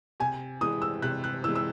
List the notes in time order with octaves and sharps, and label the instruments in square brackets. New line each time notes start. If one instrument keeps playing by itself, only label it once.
[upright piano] C3 [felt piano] G#5
[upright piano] E3 G#3 [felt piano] D#6
[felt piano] E6
[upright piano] C3 [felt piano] F#6
[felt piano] F#6
[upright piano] E3 [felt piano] E6
[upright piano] G#3
[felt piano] E6